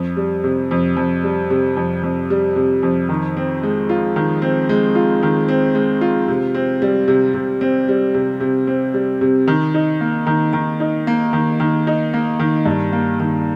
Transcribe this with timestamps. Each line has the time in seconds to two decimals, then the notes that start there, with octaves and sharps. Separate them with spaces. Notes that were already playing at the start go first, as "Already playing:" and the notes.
Already playing: F2
0.17 G3
0.44 C3
0.71 F2
0.96 F2
1.23 G3
1.50 C3
1.76 F2
2.03 F2
2.30 G3
2.56 C3
2.83 F2
3.09 D#3
3.37 C4
3.63 G#3
3.89 F4
4.16 D#3
4.42 C4
4.69 G#3
4.95 F4
5.23 D#3
5.49 C4
5.75 G#3
6.01 F4
6.28 C3
6.54 C4
6.82 G3
7.08 C3
7.34 C3
7.61 C4
7.88 G3
8.14 C3
8.40 C3
8.67 C4
8.94 G3
9.21 C3
9.47 D#3
9.74 D#4
10.01 A#3
10.27 D#3
10.53 D#3
10.80 D#4
11.07 A#3
11.33 D#3
11.60 D#3
11.87 D#4
12.14 A#3
12.39 D#3
12.66 G2
12.92 A#3
13.20 D#3